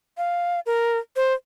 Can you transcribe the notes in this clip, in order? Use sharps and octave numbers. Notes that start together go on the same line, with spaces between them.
F5
A#4
C5